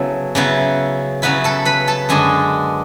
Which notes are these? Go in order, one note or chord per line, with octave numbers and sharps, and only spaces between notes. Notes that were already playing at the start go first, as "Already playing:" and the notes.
Already playing: C#3 F#3 B3 E4 A4
C#3 F#3 B3 E4
C#3 F#3 B3 E4 B4 B5
A4 A5
B4 B5
A4 A5
F#2 D3 G#3 D4 G#4 G#5